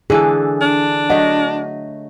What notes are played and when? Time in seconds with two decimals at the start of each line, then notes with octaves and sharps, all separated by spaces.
0.10 D3 E3 G#4 A4
0.61 D4
1.10 F#3 A3 D#5 F#5